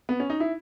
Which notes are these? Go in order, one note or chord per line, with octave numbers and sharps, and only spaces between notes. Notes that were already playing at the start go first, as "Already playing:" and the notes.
B3
C#4
D#4
E4